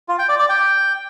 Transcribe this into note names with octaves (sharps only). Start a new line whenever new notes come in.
F4
G5
D5
D5
G5